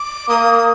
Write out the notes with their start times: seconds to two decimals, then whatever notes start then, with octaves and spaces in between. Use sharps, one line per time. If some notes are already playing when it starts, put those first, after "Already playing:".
Already playing: D6
0.29 A#3 D#6